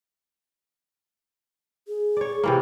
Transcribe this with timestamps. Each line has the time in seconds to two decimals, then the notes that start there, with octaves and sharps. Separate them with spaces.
1.88 G#4
2.17 C#5 D5
2.43 C3 E3 A#3